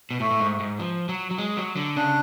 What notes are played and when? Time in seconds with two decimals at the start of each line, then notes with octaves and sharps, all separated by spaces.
0.11 B2
0.20 A2 A3
0.31 A2
0.40 G#2
0.60 G#2
0.79 F3
1.09 F#3
1.31 F#3
1.38 G#3
1.57 F#3
1.77 D3
1.96 C#3 D4